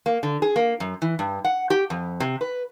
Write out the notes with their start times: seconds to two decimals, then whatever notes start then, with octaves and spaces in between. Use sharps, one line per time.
0.06 A#3
0.23 D3
0.42 G#4
0.56 A#3
0.80 F#2
1.02 E3
1.19 G2
1.44 F#5
1.70 G4
1.90 F2
2.20 C3
2.41 B4